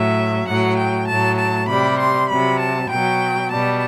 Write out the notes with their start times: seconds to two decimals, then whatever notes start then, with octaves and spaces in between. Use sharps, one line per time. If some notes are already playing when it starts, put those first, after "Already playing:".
Already playing: A2 F#3 E5
0.46 A2 F#3 F#5
0.77 G5
1.07 A2 F#3 A5
1.38 A5
1.68 C3 G3 B5
1.98 C6
2.29 C3 F#3 B5
2.59 A5
2.90 B2 F#3 G5
3.50 B2 G3 A5